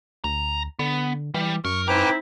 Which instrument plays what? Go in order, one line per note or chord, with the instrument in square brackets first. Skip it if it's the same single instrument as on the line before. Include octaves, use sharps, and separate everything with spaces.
[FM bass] D2 [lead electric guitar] A#5
[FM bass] D3 [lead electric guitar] B3
[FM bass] E3 [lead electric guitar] G3
[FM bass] F#2 [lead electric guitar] A#4 [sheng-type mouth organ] C#6
[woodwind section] C4 D#4 E4 [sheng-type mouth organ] B4 G5 D6 [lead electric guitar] G#5 A#5